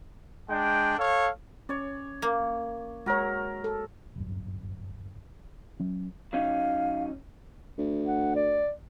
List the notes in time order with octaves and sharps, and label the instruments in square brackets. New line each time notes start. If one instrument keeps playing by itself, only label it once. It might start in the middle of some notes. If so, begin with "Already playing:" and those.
[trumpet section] G#3 D4 G5
A4 C#5 F5
[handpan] C#4 [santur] C#5 D5
[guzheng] A#3
[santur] F#3 A#4 [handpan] G#3 C#5
[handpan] A4
[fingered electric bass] D1 G1 F#2
F#3 C#4
[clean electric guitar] F#3 C#4 D#4 [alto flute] F5
[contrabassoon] D2
[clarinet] F#5
D5